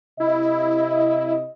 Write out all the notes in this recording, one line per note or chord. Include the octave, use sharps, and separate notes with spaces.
C3 E4 D#5